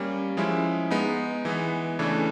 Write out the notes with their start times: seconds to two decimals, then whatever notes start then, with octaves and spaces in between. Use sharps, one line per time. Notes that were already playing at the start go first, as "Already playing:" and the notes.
Already playing: G3 A#3 C#4
0.37 F3 G#3 C#4 E4
0.91 G#3 B3 D#4
1.45 E3 G#3 B3
1.99 C#3 E3 A3 D4